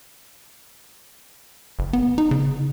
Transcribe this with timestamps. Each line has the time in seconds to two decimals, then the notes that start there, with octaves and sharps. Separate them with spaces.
1.79 F#1
1.93 B3
2.18 D#4
2.31 C#3